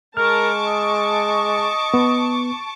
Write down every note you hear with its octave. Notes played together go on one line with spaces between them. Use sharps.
G#3 A#4 A5 C#6 D6 F6
D#5
B3